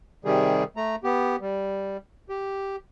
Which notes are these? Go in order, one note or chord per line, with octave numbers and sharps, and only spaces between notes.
C3 D#3 G3 G#4
A3 A#5
B3 G4
G3
G4